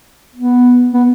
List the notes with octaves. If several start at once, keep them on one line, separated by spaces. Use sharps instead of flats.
B3
B3